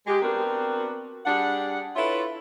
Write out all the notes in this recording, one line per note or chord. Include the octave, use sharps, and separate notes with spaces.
G#3 G4
B3 C4 D4 F#4 A#4
G3 D4 G#4 F#5
E4 F4 A4 B4 C#5 E5